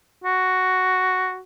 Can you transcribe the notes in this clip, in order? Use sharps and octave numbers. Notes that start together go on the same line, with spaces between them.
F#4